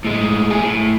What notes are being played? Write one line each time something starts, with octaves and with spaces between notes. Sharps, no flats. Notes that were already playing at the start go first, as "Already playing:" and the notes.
A2 G#3
A3 G#4
A2